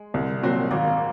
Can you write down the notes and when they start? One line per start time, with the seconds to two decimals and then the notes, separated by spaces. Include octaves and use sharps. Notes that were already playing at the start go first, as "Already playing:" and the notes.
Already playing: G#3
0.14 C2
0.42 A#2 F#3 C4 F#4
0.71 G#1 A#3